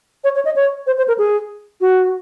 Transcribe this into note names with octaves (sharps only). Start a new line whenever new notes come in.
C#5
C#5
D#5
C#5
C5
C5
A#4
G#4
F#4